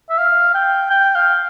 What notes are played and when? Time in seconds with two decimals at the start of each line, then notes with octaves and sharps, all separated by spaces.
0.10 E5
0.18 F5
0.55 G5
0.90 G5
1.15 F5